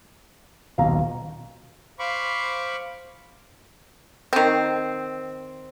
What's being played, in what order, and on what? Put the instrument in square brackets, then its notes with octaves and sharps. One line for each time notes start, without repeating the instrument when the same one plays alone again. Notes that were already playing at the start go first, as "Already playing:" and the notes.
[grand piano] D#1 B1 A#5 [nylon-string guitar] F5
[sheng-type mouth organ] C5 F5 B5 C#6 D6
[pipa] D#3 C4